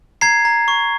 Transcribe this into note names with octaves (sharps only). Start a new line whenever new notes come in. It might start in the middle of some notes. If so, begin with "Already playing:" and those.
A#5 G#6 C7
A#5
C#6